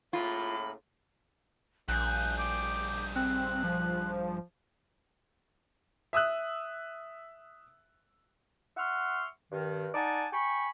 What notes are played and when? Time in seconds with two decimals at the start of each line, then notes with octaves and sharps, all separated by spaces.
0.13 A2 C#3 A#3 F4 B5
1.89 A#1 G2 G#4 F#6 G6
2.38 D6
3.16 C4 F#6
3.63 F3
6.13 E5 D#6 E6 F#6
8.77 E5 F#5 C6 C#6 F6
9.52 G2 D#3
9.94 D#4 D5 F#5 G#5 A5
10.33 G5 G#5 B5 C#6